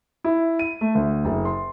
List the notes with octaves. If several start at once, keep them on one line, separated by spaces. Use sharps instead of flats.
E4
D#7
A3
D2
F#1
C6